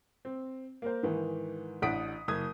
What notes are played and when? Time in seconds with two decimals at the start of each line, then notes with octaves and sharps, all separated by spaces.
0.25 C4
0.82 A#3 A#4 C5
1.03 G#2 D#3 E3
1.82 A1 D4 F#5 D#6 B6 D7
2.28 F#1 D#6 G#6